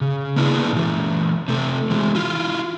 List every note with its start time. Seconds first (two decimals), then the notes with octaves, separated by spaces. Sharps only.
0.01 C#3
0.36 A#3 B3 D4 E4 G#4
0.73 A#2 E3
1.48 C3 A3
1.90 E3 G#3
2.15 E4 F4